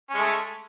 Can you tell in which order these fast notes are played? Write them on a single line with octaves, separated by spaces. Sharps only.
C#4 G#3 A3